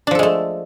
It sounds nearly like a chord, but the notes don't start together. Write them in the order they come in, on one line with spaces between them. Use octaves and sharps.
D4 F3 A4 G#3 A3